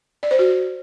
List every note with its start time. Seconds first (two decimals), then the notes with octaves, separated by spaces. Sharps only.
0.23 D5
0.31 C5
0.39 F#4